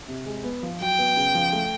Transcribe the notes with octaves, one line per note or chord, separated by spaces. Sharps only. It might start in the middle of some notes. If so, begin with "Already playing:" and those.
C3
G#3
B3
F3
F#3 G5
B3
C#3
F3
A3